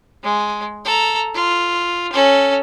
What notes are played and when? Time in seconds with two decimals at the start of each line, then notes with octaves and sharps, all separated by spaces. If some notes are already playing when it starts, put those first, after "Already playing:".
0.24 G#3
0.85 A4 A#5
1.35 F4
2.13 C#4 A4